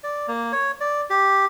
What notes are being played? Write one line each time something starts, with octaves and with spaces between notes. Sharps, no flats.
D5
A#3
C#5
D5
G4